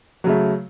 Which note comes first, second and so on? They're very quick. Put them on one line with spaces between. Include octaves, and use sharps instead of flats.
F#3 C#3 A3